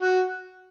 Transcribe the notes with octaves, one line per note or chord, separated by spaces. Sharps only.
F#4